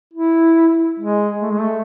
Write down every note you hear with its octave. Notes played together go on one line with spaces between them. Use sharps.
E4
G#3
A3
G#3
A3